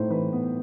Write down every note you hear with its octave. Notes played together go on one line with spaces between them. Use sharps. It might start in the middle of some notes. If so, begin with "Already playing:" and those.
Already playing: A2 D#4 C5
E3 B4
B3